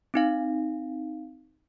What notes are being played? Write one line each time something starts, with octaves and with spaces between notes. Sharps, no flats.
C4 D#4 F5